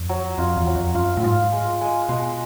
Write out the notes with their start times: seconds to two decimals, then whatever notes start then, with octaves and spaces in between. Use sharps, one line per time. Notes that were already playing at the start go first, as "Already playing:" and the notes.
Already playing: F2
0.09 F#3
0.38 F2 F4
0.57 E2
0.66 F#3
0.76 F2
0.95 F#2 F4
1.17 A2
1.23 G#2 F4
1.52 G#3
1.81 G#3
2.09 B2 G#3